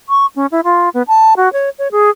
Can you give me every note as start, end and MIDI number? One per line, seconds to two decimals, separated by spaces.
0.09 0.26 85
0.36 0.46 61
0.52 0.61 64
0.64 0.89 65
0.94 1.02 59
1.08 1.34 81
1.37 1.52 66
1.53 1.70 73
1.79 1.88 73
1.92 2.10 68